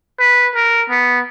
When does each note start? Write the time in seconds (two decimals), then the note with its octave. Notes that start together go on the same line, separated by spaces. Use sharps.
0.20 B4
0.55 A#4
0.90 B3